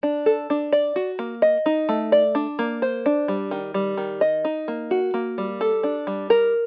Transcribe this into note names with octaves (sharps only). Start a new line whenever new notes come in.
D4
A4
D4
D5
F#4
A#3
D#5
D#4
A3
D5
D4
A#3
C5
D4
G3
D#3
G3
D#3
D#5
D#4
A#3
F#4
A#3
G3
A4
D4
G3
A#4